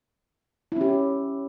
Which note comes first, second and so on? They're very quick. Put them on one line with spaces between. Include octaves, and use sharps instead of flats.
E4 C#4 G4